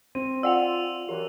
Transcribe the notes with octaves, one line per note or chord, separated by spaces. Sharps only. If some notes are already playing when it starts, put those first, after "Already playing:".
C4 D#7
F4 D5 F#5 G5 E6 F7
F#2 E3 G4